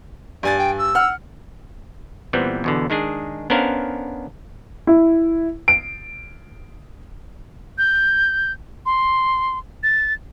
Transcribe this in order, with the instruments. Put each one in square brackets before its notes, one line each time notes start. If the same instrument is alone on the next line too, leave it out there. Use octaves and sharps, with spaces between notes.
[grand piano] G2 G#5 A6 [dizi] D5
[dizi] G5
E6
[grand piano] F#5 F6
[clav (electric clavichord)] A#2 E3 G3 B3 C4
E2 B2 D3
D#3 G#3 D4 G#4
B3 C#4 D4 A#4 C5 F5
[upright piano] E4
D7
[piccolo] G6
C6
A6